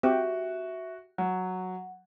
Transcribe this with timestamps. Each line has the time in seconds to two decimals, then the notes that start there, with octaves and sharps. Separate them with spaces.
0.03 C4 F#4 G4 E5
1.18 F#3 F#5